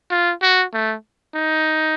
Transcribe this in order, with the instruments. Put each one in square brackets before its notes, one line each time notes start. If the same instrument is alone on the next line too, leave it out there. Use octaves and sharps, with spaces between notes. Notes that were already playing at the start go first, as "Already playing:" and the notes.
[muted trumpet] F4
F#4
A3
D#4